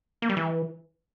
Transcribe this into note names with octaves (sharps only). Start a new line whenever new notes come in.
A#3
G3
E3